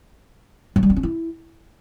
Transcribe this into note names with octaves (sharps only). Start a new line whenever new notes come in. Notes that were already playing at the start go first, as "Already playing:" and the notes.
F#3
G3
C4
C#4
E4